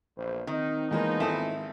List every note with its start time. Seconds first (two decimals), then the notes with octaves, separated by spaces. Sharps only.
0.17 A#1 E2 C5
0.47 D#3 C4 D#4
0.91 E2 F3 G#3 A#3 B3 D#4 G6
1.20 G#1 E4 A4 G#5 D#6